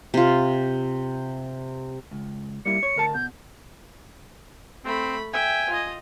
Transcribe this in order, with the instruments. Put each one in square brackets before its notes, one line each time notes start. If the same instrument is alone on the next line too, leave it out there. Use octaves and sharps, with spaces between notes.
[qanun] C3 F4
[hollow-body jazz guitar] C#2
[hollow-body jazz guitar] G3 A#3 E4 [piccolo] C#7
[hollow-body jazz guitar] C#5
D2 A#4 A5
[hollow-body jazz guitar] B2 [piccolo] G6
[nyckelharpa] A3 B5 [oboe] C4
[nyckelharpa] E5 G5 [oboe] G#5
[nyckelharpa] F4 D#5